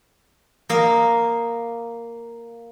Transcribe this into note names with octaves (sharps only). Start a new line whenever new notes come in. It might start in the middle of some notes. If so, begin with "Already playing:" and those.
A#3 D#5 F5